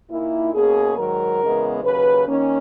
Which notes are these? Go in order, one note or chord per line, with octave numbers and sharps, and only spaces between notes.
A#2 A#3 D#4 E4
B2 A#3 C#4 G#4
G#2 D#3 F#3 A#4
E2 C#3 G#3 B3
D#2 C#3 F#3 B4
D#3 A#3 C#4